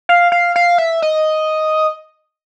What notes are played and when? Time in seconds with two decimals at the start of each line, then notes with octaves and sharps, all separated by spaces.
0.09 F5
0.32 F5
0.56 F5
0.78 E5
1.02 D#5